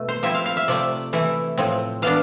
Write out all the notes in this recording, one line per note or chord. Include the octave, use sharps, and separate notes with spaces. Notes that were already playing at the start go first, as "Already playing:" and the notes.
Already playing: B2 A3
C5
F3 C4 E4 E5
F5
F5
E5
C3 F3 A3 D5
E3 A3 E4
A2 F3 C4
E3 B3 D4 F5